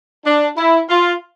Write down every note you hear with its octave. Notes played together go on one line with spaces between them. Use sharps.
D4
E4
F4